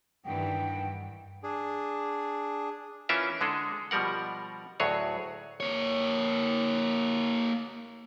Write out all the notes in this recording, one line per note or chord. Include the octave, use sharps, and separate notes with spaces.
G2 D#3 E3 D4 F#5 G5
D4 G#4
E3 C#4 F4 A#4 E5
D3 G#3 G#4 A4
B2 F3 G3 A#4 F#5
D2 A2 F#3 G#4 C#5
A#3 C#5